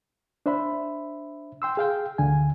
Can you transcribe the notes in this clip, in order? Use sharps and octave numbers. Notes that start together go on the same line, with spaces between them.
D4 C5 E5 B5
G5 C6 E6
G#4 F5 G5
D2 D3 G#5